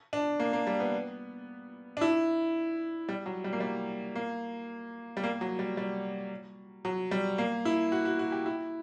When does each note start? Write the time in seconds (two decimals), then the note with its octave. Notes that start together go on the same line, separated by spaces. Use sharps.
0.13 D4
0.40 A#3
0.53 A#3
0.67 G3
0.80 B3
1.97 D4
2.01 E4
3.09 G3
3.26 F#3
3.44 G3
3.53 A#3
3.60 G3
4.15 A#3
5.17 G3
5.24 A#3
5.41 F#3
5.59 G3
5.77 G3
6.85 F#3
7.11 G3
7.38 A#3
7.65 E4
7.92 F#4
8.05 F#4
8.19 F#4
8.32 G4
8.46 E4